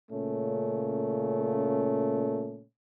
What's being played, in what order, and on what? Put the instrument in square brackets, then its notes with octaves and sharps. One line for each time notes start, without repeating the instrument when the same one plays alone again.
[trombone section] A#2 C#3 A3 C#4